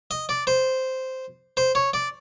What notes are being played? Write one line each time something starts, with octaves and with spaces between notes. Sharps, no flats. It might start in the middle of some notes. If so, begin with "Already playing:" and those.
D#5
D5
C5
C5
C#5
D5